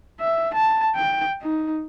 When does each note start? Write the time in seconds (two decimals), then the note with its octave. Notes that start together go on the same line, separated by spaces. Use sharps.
0.20 E5
0.54 A5
0.95 G5
1.42 D#4